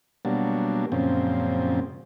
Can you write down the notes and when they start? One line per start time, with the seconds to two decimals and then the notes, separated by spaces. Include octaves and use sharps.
0.25 B2 F#3 G3 A#3 D4
0.92 F#2 A#2 C#3 F3 C4